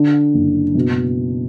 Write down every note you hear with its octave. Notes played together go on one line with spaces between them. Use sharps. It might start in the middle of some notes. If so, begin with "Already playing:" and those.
Already playing: D3
F#1
B2